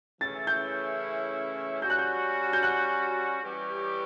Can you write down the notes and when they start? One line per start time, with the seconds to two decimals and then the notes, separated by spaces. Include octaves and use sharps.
0.21 C#3 E3 A3 C#4 E4 A6
0.47 G6
1.82 G3 C#4 F#4 G6
1.90 F#6
1.99 G6
2.53 G6
2.63 F#6
3.42 E3 G3 C#4 G4